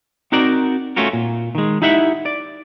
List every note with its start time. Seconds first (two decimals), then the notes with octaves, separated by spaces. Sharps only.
0.32 C4 D#4 F#4 A#4 D5
0.96 A3 C#4 F4 F#4 A#4
1.13 A#2
1.55 D#3 G#3
1.82 D#4 E4 G4 E5 F#5
2.26 D5